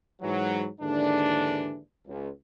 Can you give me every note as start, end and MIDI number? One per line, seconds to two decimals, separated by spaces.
0.21 0.67 44
0.21 0.67 52
0.21 0.67 54
0.81 1.77 39
0.81 1.77 44
0.81 1.77 50
0.81 1.77 52
0.81 1.77 62
2.07 2.29 37